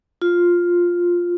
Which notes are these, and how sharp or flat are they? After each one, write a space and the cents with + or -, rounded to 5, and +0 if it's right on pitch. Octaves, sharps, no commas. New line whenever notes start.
F4 +5